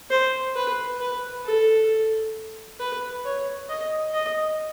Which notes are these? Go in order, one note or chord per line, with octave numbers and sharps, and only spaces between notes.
C5
B4
B4
A4
B4
C#5
D#5
D#5